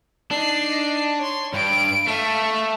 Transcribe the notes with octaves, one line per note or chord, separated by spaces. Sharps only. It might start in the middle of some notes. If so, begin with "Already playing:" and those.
D4 D#4 C7
C#5 C6
G2 D7
A3 E5 F5